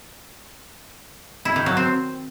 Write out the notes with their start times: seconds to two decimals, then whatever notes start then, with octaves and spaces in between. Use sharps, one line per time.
1.45 E4
1.56 D#3
1.66 F#3
1.77 C4